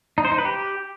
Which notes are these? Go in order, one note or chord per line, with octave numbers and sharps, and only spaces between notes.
D#4
C5
D#4
B4
G4